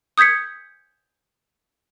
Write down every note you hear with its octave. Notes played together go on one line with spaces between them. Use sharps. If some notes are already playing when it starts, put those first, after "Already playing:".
D#6 G6 G#6 B6 C#7